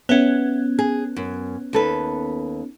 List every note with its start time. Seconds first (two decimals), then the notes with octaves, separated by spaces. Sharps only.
0.09 B3 C#4 E5 F#5
0.79 G#4
1.16 F#2
1.73 D#2 A4 B4